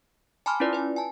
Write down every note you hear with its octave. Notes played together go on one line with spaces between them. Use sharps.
G#5 A5 B5 C6 D6 F6
C#4 E4 F4 B4 D5
B4 G#5
G#5 A5